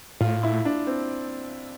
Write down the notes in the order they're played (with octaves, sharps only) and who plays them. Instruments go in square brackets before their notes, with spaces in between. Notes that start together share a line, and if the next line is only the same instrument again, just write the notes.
[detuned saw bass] A2 [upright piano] F4
[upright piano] E4
D4
C4